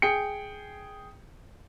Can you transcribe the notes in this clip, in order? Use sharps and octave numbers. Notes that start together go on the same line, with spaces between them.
G#4 G5 C#7